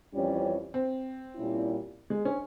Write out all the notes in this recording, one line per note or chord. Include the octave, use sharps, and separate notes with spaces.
F2 E3 G3 C#4
C4
A#2 G3 C#4 E4
G#3
C#4